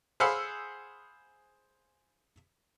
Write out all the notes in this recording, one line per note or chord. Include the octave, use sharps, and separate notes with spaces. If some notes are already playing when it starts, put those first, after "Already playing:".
G#4 C5 F5 F#5 B5 E6